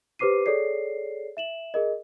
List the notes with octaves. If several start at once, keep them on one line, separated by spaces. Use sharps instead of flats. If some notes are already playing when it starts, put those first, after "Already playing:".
G4 B4 C5 D6 C7 D#7
G#4 A4 C#5 D5 C7
E5 E7 F#7
G#4 A#4 D#5